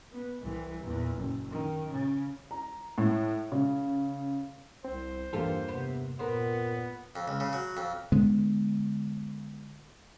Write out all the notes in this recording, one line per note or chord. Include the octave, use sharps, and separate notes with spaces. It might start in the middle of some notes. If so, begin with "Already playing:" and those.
B3
C2 E3
E2 A#2
F#1
D#3
C#3
A#5
A2
C#3
C2 C4 C5
E2 G2 E3 A#3 F4 G4 A4
C3 B3
A#2 B3 C4 A#4
F2
C#2
C#3
F#3
F2
D3 G#3 B3